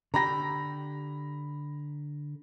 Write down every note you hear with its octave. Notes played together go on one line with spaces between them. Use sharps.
D3 G4 A#5 B5 A#6